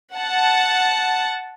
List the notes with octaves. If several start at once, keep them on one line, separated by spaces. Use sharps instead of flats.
F#5 A5